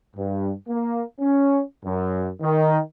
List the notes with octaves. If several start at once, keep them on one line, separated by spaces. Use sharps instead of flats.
G2
A#3
C#4
F#2
D#3